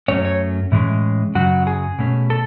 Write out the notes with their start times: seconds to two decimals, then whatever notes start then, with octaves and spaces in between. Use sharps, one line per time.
0.08 F#2 C#3 F#3 A3 C#4 C#5
0.25 C#5
0.72 A2 E3 G#3 C#4
1.35 F#2 C#3 F#3 F#4
1.67 G#4
1.99 B2 A3 C#4
2.30 A4